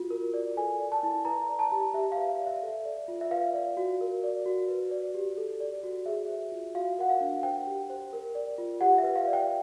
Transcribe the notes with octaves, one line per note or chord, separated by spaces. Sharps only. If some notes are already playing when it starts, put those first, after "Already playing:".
Already playing: F4 F#4
A#4
D5
A4 G#5
D5
A5
E4
B4 A#5
D5
A5
G4
G4 E5
B4 F5
F5
D5
E5
A4
D5
F4
E5
B4 F5
D5
F#4
A#4
D5
F#4
B4
D5
G4
A4
D5
F#4
G#4 E5
C5
F4
F#4 F5
A#4 F#5
F5
D4
C5 G5
G4
C5
A#4
D5
F4
G4 F#5
E5
B4
F5
D5
G5